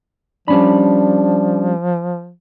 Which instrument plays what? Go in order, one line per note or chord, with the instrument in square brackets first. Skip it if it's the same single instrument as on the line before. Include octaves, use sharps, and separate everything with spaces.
[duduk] F3 [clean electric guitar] G3 C#4 B5 [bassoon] D4